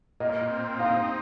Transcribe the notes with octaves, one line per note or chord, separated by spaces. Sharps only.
A#2 D#5
C4
D#4 F5